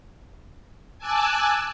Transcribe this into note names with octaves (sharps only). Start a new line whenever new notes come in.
G#5 A5 D6 E6 F#6